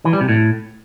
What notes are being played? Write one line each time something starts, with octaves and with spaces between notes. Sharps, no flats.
E3
G3
C3
A2